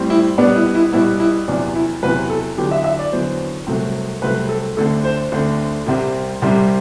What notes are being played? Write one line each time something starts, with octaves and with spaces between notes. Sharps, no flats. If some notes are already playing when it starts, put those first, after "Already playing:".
Already playing: A2 G3 C4
E4
B2 G3 B3 D4
E4
E4
B2 G3 B3 E4
E4
E2 C3 F#3 D4
E4
E2 C3 F#3 B4
A4
E2 D3 F#3 B3 G4
E5
E5
D5
E2 D3 F#3 B3 C5
C2 C3 F#3 A3 C4
C2 C3 F#3 A3 C4 B4
A4
D2 D3 A3 C4 A4
C5
D2 D3 A3 C4
C2 C3 G3 C4
C2 C3 G3 C4